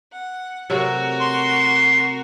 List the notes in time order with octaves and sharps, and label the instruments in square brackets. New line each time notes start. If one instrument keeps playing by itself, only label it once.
[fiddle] F#5
[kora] C3 F#3 A3 [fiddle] F#4 A#4
[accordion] C6